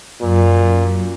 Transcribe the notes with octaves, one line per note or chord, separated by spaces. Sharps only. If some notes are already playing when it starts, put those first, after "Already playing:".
F#2 A#2